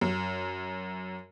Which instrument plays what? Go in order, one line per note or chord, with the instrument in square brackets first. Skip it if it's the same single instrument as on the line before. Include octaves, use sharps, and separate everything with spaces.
[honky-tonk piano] F#2